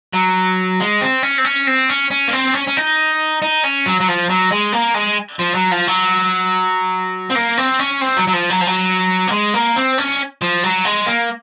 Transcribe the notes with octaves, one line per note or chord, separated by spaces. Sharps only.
F#3
G#3
C4
C#4
C4
C#4
C4
C#4
C#4
A#3
C4
C#4
C#4
D#4
D#4
C#4
F#3
F#3
F3
F#3
G#3
A#3
G#3
F3
F#3
F3
F#3
C4
A#3
C4
C#4
C4
F#3
F#3
F3
F#3
F3
F#3
A#3
G#3
A#3
C4
C#4
F3
F#3
G#3
A#3